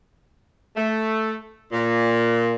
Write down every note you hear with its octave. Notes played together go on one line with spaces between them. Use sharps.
A3
A#2